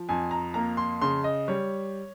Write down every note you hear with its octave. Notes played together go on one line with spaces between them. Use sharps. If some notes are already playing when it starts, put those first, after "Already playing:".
Already playing: F3
F2 G#5
A#5
A#3 A#5
C6
C#3 C6
D#5
G3 C#5